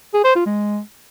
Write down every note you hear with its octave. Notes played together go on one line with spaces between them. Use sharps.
G#4
C5
F4
G#3